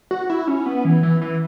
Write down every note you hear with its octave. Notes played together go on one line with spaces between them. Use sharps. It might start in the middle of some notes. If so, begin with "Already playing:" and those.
F#4
E4
C#4
B3
E3
E3
E3